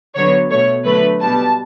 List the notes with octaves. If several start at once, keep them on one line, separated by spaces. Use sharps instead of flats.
D3 F#3 B3 C#5
B2 A3 C#5
D3 F#3 A3 B4
B2 G3 B3 A5